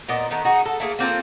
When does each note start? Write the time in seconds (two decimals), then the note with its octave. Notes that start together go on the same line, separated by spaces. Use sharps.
0.08 A#2 B3 A#4 D#5
0.31 D#3 A3 B3
0.45 D#4 F#4 G#4
0.66 A4
0.80 A3 A#3 G#4
0.99 A#3 C4 F4 A4